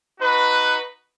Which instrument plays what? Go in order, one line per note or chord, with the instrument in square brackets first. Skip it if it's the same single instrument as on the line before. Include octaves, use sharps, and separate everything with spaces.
[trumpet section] D#4 F#4 B4